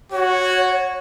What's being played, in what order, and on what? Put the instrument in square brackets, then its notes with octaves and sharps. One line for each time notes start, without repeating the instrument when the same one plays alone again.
[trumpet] F#4 [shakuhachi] C#5